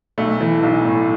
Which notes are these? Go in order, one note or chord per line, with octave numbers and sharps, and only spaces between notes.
B1 A3
E3
B1
A2